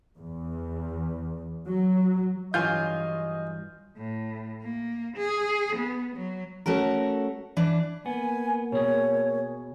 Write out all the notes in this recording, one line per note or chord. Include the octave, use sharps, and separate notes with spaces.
E2
F#3
G2 E3 F#3 F4 D#5 G#5 F6 G6
A2
A#3
G#4
B3
F#3
A3 C#4 F#4 A#4
E3 D4
A#3 B3 G#5
B2 G#4 C#5